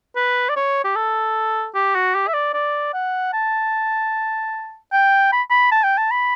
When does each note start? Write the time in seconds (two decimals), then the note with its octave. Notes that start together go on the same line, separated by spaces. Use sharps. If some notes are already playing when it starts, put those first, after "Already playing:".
0.16 B4
0.49 D5
0.56 C#5
0.84 G4
0.96 A4
1.75 G4
1.95 F#4
2.15 G4
2.28 E5
2.34 D5
2.53 D5
2.94 F#5
3.33 A5
4.93 G5
5.32 B5
5.50 B5
5.71 A5
5.84 G5
5.98 A5
6.11 B5